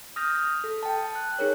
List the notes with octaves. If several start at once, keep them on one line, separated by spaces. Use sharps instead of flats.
D#6 F6 G6 A#6
A4
G5 A5
F#6
D#4 G#4 A#4 C#5